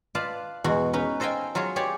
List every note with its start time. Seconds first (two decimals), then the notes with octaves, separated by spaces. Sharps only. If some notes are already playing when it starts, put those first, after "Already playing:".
0.15 F4 B4 D5 F5 A5
0.64 E2 B2 G#3 F#4
0.93 C#4 D#4 B4
1.20 A4 C5 D#5 F5 G5 G#5
1.55 F#3 F4 G#4 C#5
1.76 G4 G#4 C#5 D5